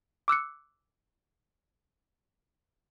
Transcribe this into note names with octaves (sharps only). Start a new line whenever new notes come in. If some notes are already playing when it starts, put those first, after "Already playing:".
D6 E6 F#6 C#7